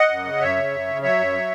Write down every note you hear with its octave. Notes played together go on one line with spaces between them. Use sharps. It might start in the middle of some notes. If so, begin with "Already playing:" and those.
Already playing: D#5 F#5
F#2
C#3
F#2 C#5 E5
C#3
F#2
C#3
F#3 C#5 E5
F#2
F#3